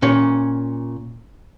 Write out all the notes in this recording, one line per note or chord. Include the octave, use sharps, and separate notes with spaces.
A#2 C#4